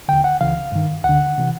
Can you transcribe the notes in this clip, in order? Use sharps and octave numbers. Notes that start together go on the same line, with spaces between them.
D#2 D3 G5
F#5
C#2 C#3 E3 F5
G2 D#3
D2 F#5
D3
C3 E3